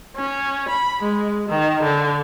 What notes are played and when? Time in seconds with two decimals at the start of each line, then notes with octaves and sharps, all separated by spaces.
0.16 C#4
0.70 B5
1.02 G#3
1.48 D#3
1.82 D3